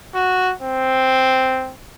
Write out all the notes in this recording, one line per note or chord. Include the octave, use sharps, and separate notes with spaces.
F#4
C4